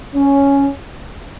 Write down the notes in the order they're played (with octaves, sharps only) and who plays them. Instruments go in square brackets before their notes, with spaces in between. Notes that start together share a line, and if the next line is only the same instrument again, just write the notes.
[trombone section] C#4